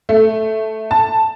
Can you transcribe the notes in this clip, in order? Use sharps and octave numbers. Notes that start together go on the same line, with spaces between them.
A3
A5